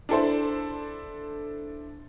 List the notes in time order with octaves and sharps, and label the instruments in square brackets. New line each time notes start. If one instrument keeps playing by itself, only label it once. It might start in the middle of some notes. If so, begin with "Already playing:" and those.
[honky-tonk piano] D4 E4 A4 C5